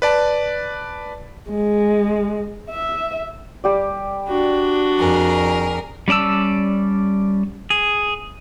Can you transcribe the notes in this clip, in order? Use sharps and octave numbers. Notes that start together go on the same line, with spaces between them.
B4 D5 A5
G#3
E5
G3 G4 D5
D4 F#4
F2 G#4 A#4
G3 C#4 D5 A5 E6
G#4